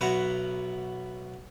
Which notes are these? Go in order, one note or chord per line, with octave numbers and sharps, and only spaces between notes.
B1 B2 E4 F#5 A#5